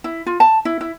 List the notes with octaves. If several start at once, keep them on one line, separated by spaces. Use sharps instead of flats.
E4
F4
A5
E4
E4